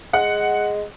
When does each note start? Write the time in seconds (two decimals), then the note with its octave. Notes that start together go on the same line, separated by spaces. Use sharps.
0.13 G#3 F#5